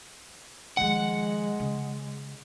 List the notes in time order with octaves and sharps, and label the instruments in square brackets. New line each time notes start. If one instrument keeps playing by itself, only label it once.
[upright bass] D#3 F3 [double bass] G#3 [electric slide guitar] F#5
[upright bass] C#3